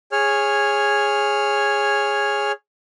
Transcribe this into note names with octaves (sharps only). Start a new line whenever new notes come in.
G#4 C#5 F6